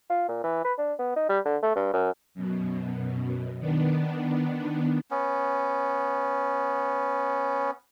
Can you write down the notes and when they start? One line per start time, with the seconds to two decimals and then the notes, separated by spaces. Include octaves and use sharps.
0.10 F4
0.28 A#2
0.44 E3
0.64 B4
0.78 D4
0.99 B3
1.16 D#4
1.29 G3
1.45 D3
1.62 A3
1.76 G2
1.93 F#2
2.34 F#2 B2
3.60 D#3 B3 D4
5.11 B3 C#4